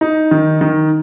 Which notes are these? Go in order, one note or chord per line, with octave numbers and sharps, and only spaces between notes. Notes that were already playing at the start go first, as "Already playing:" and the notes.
D#4
D#3
D#3